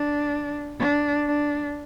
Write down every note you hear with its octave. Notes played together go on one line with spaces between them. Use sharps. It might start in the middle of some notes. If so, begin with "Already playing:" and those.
Already playing: D4
D4
D4